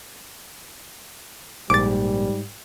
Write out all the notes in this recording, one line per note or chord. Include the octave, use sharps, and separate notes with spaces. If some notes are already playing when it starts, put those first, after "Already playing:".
A#1 G#2 G3 D6 A6